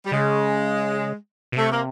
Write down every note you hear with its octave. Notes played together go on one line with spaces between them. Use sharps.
G3
C#3 G#3
B2
C3 A3
A#3